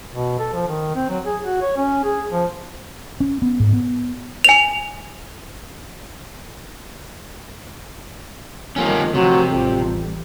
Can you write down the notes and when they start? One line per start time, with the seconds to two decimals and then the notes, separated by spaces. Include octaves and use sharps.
0.13 B2
0.39 A4
0.53 F3
0.68 D#3
0.95 C4
1.09 F#3
1.26 G#4
1.43 F#4
1.61 C#5
1.77 C#4
2.04 G#4
2.32 F3
3.20 C#4
3.42 B3
3.60 G#2
3.73 B3
4.44 G#5 F7
8.76 F2 D3 D#3 G3 A#3 C#4
9.14 C3 D#3 F3 F#3 A3
9.50 A1 F2 G3